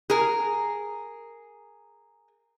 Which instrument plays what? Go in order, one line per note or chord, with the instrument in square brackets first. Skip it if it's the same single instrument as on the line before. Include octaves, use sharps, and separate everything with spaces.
[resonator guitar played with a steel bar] G#4 A#4